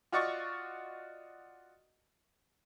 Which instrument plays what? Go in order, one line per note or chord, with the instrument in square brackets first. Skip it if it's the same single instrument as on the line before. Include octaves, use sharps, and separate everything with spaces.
[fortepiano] F4 F#4 D5 D#5 C#6